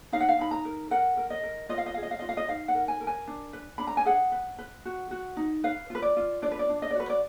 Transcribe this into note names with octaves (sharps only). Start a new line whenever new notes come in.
D#4 F5
F#5
F5
D#4 B5
A#5
A#4
A#4 F#5
A#4
D#5
A#4
F4 D#5
F5
D#5
G#4 F5
D#5
F5
F4 D#5
F5
D#5
D#4 F5
F#5
A#4
G#5
A#4
G#5
D4
B4
D4 B5
A#5
G#5
G#4 F#5
B4
B4
F#4
F#4
D#4
B4 F5
F4 B4
D5
F4
D4 D5
B4
D5
D4
D#5
D5
F#4 B4
D5